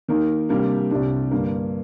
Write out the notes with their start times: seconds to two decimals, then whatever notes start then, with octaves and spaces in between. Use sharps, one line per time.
0.08 D#3 A#3 D#4 A#4
0.49 C3 G3 A#3 D4
0.91 C2 C3 G3 D4
1.31 G2 D3 G3 A#3